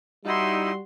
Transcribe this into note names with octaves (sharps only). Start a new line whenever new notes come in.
G3 D#4 E4 F#4 C6